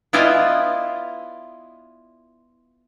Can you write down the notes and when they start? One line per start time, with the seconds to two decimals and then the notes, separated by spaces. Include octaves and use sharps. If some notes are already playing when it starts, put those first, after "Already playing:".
0.13 B3 E4 F4 D5 D#5 G#5